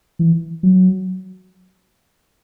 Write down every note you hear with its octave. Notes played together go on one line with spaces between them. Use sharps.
E3
F#3